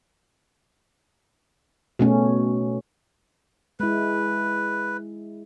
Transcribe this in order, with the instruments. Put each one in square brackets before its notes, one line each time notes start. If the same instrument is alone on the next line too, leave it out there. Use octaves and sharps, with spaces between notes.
[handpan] B2 A3 C#4
[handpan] G#3 E4 [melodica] B4